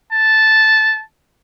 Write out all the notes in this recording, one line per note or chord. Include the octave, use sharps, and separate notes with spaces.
A5